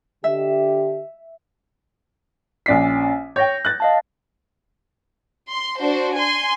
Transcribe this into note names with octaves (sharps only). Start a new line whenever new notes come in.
D3 G4 E5
A#1 C#4 D5 B6 C7
C#5 G5 G6 A#6
F#6 A6
D#5 F5 A5
C6
D4 F#4 C5
G#5 C6